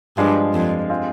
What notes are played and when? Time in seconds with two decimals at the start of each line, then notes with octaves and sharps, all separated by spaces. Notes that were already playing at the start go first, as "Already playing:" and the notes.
0.17 G2 F3 G#3 D4 F4 G#4
0.54 F2
0.90 G#3 C4 F4 G#4